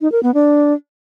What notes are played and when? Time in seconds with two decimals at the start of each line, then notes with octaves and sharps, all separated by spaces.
0.01 D#4
0.12 A#4
0.23 B3
0.34 D4